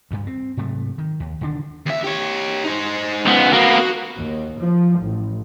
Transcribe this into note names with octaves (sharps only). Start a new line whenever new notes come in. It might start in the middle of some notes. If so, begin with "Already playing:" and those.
D2 G2
C4
G#2 C3 F#3 A3
D#3
D#2
E1 D3 D#3 D4
D#2 E5
G4 C#5
D#4 C5
C#2 B3
A#3 B3 F#4
D#2
F3
A1